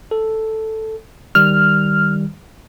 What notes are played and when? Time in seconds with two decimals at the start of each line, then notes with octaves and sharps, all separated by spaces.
0.11 A4
1.35 D#3 G3 F6